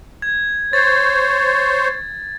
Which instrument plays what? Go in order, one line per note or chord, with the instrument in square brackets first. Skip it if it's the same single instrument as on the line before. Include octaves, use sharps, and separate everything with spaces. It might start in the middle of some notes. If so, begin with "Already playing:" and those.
[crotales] G#6
[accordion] C5 C#5 [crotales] A6